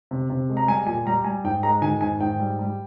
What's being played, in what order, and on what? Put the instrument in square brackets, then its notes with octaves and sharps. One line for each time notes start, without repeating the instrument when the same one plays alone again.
[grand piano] C3
C3
G#3
A#5
G3 G#5
A#2 G#5
G3 A#5
G3 G#5
G#2 G5
G#3 A#5
D#3 G#5
G#2 G#5
G#2 G5
G3
G3